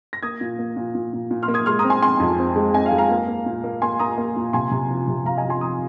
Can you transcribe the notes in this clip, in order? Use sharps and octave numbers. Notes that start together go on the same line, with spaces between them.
A#6
A#3 D#6 G#6
A#2
A#3
A#2
A#2
A#2
A#2
C6 F6
A#3
D#6 G#6
G#3 C6 F6
A#5 D#6
C4
G#5 C6
C4 G#5 C6
F2
C4
G#3
C4 D#5 G#5
F5
G#3
F5 A#5
A#3
A#3
A#2
A#3
A#3 G#5 C6
A#3 A#5 D#6
A#3
A#2
C3 G#5 C6
C3
F3
C3
C3 F5 A#5
D#5 G#5
F3
G#5 C6
F3 A#5 D#6